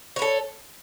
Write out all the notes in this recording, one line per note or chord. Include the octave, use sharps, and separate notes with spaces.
A4 B4 C#5